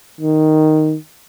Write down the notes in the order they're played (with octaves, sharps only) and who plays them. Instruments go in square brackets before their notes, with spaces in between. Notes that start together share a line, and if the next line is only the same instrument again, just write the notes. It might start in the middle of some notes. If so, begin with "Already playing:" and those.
[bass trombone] D#3